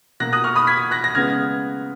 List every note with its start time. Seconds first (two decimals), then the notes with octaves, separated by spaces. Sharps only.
0.20 B2 A#3 F#6 A#6
0.33 D#6 F#6
0.44 C#6 F6
0.55 B5 D#6
0.67 G#6 B6
0.91 F#6 A#6
1.04 A#6
1.15 C#3 G#3 B3 F6 G#6